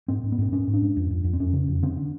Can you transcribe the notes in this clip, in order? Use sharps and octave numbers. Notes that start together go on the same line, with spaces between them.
G#2 C4
G#2
B3
G#2 C4
G#2 C#4
G#2
D4
G#2
F2
F2
F2
C4
F2 C#4
C#3
F2
D3 C4
D3